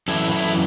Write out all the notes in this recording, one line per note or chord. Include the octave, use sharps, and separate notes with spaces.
F#2 E3 E4 A4
E4 A4